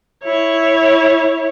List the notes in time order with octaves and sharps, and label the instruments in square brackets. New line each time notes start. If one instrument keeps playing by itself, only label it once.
[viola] E4 C#5